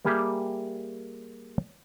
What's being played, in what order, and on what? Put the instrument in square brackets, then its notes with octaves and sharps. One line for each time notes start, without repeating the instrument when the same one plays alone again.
[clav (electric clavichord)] G3 A#3 G4 G#4 E5